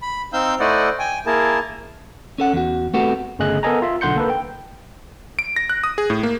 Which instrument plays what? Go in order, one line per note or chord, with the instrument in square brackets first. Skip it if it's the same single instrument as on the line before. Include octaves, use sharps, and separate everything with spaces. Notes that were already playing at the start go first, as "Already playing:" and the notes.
[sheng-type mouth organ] B5
C4 D#4 F5 E6 G6
A3 E4 C5 D5 D#5 F#5
G5 G#5
A#3 E4 G#4 A#4 A5
[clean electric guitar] C#4 A4 F#5
E2 F#4
A3 B3 C4 F#4 G4 A4
[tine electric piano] G1 C#3 A3 G#4 D#5 F#6
B3 A4 A#4 D#5 G#5 A#5
F4 E5
B1 D3 F#5 C6 G6 C#7
A#3 A4 B4
G5
[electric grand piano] D7
A#6
F#6
D#6
G#4
A2
A#3